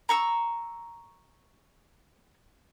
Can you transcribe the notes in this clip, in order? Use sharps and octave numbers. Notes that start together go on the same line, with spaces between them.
A#5 C#6 E6